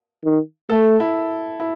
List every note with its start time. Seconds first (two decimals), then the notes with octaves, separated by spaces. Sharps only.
0.25 D#3
0.70 A3 A4
1.00 E4
1.60 E4